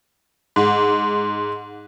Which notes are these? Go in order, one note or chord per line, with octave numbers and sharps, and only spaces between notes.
G#2